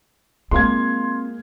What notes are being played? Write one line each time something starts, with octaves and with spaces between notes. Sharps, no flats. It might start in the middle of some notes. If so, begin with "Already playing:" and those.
G#3 A#3 C4 F4 F5 C6 G#6